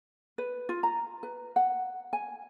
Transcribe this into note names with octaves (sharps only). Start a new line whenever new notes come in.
B4
F4
A#5
B4
F#5
G#5